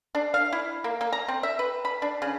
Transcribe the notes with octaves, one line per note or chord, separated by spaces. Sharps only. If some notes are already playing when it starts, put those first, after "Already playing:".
D4
F5
E4
A#3
A#3
A#5
C4
E5
B4
B5
D4
C#3